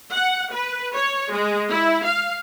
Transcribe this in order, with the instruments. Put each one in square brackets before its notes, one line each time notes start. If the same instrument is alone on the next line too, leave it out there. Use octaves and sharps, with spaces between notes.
[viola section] F#5
B4
C#5
G#3
E4
F5